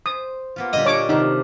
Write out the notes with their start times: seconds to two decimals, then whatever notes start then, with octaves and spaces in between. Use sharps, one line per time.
0.06 C5 D#6
0.56 A#3 B3 F4
0.73 A#2 D3 G3 D#5
0.86 D4 C#5 A#5 D6
1.09 C3 D#3 A3 D#4